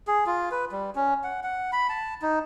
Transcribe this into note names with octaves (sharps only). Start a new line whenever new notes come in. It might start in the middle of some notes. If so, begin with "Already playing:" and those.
G#4
F4
B4
G3
C#4
F#5
F#5
B5
A5
D#4